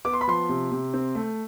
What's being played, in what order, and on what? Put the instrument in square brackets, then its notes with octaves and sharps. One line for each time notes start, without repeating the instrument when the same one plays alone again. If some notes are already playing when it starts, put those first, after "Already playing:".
[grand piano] B3 D6
C6
B5
F3 C6
C3
C3
C4
A3